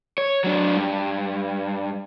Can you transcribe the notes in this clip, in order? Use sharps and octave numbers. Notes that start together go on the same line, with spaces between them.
C#5
F#3 D4
G2